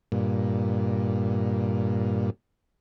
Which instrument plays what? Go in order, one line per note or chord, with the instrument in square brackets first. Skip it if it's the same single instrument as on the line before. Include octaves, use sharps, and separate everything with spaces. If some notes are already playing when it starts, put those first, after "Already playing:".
[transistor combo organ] G2 A#2